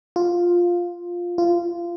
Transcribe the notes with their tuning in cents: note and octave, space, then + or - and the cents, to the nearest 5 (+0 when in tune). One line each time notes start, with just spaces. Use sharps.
F4 +5
F4 -20